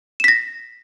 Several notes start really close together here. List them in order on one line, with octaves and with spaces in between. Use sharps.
E7 B6 A#6